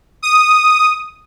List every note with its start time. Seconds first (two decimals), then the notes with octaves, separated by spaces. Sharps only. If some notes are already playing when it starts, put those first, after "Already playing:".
0.22 D#6